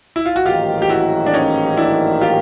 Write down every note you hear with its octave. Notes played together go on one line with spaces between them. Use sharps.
E4
F4
F#4
A1 G#2 D#3 F#3 A#3 F4 G4
G4
E4 F#4
D4
C#4 D#4
D4 E4
F4 G4